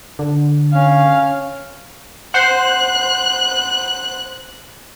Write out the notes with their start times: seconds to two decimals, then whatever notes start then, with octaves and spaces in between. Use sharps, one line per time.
0.19 D3
0.73 C#4 F5
2.34 C5 F#5 F#6 C7